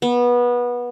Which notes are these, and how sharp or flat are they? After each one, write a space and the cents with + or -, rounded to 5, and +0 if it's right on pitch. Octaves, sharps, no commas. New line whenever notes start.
B3 -20